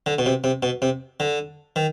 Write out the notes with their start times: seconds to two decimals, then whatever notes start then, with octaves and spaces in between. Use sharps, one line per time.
0.06 D3
0.18 B2
0.26 C3
0.44 C3
0.63 B2
0.82 C3
1.20 D3
1.76 D#3